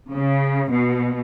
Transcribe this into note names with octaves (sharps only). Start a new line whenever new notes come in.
C#3
B2